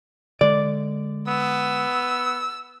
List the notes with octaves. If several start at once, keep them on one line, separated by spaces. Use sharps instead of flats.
D3 G#3 D5
B3 E6